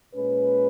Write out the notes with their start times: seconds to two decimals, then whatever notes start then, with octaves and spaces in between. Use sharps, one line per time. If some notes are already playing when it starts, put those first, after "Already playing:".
0.14 A#2 G#3 C#4 B4